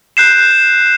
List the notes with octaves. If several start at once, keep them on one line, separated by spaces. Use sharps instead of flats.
F#6 G6 C7 E7